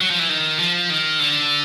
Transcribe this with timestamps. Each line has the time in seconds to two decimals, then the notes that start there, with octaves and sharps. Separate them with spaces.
0.01 F#3
0.11 F3
0.19 E3
0.29 D#3
0.59 F3
0.90 D#3
1.19 D3